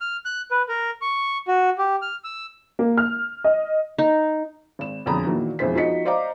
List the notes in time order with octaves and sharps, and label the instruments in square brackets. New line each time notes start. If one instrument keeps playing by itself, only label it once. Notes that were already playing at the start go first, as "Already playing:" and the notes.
[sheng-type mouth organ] F6
F#6
B4
A#4
C#6
F#4
G4
F6
E6
[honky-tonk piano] A#3
F6
D#5
[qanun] D#4
[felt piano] G#1 E7
E1 F2 D3 A#5 B5 D#6
A#2 D#3 E3 F#4
E1 F2 E4 C5 B6
F3 D#4 F#4 D#5 B6 C#7
C5 D5 D#5 F5 A#5 D6